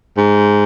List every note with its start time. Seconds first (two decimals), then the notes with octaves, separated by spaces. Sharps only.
0.17 G#2